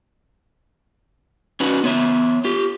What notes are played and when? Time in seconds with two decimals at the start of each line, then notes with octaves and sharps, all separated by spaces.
1.60 C#4 D#4 F#4 B4
1.84 B3 C#5 E5
2.45 F4 G4